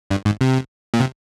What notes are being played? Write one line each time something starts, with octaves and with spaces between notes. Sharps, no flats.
G2
G#2
C3
A#2
C3